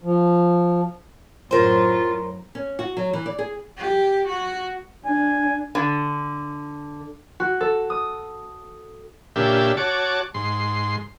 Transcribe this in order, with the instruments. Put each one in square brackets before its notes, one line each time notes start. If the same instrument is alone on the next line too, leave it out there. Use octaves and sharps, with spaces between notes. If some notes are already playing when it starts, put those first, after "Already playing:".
[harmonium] F3
[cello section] F#2 A2 [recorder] F4 [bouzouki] A#4 C5
[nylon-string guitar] C#4
F#4
F#3
E3
D5
G#4
[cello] G4
F#4
[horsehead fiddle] D4 [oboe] G#5
[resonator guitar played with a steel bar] D3
[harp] F#4
A4
D#6
[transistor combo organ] A#2 C#3 D4 G4 E5
F#4 C#5 A5 D6
G#2 C6